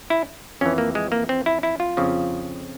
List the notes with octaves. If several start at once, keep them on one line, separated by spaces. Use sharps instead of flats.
E4
F2 E3 C#4
A#3
G#3
A#3
C4
E4
E4
F4
F2 C#3 F3